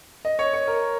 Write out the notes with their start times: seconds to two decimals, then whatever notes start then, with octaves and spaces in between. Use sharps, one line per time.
0.25 D#5
0.39 C#5
0.53 C#5
0.68 A#4